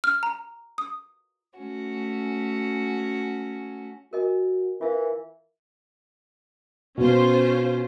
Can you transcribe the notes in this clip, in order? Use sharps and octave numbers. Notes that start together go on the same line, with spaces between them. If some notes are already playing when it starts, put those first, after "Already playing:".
F6
A#5
D#6
A3 C#4 F#4
F#4 A#4 D#5 G#5
E3 F4 A#4 E5 F5
B2 C#4 F4 C5